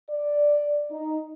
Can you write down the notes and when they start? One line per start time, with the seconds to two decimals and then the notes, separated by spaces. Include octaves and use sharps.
0.10 D5
0.92 D#4